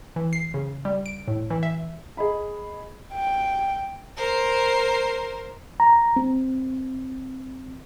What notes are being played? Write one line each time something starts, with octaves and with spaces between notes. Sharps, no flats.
E3
C7
C#3
G3
D7
A2
E3
E5
G#4 D#5 B5
G5
A#4 C5
A#5
C4